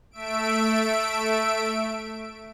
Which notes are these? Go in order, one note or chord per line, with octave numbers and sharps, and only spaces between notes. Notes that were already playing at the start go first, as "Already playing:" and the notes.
A3 E5 D7